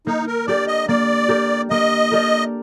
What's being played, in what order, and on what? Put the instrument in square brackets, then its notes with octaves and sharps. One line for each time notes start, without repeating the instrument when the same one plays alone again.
[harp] A#3 [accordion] D#4
[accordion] A#4
[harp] D4 G4 A#4 [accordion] D5
[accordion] D#5
[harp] A#3 [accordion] D5
[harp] D4 G4 A#4
[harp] A#3 [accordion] D#5
[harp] D4 G4 A#4